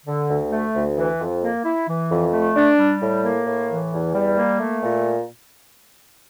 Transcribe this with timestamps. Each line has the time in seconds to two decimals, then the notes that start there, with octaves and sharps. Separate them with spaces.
0.06 D3
0.30 D2
0.51 A3
0.75 D2
0.97 E3
1.20 F2
1.42 A#3
1.65 E4
1.88 E3
2.11 F2
2.33 A3
2.56 D4
2.78 G3
3.02 A2
3.24 A#3
3.46 A2
3.70 E3
3.92 E2
4.14 G3
4.37 A#3
4.60 A3
4.83 A#2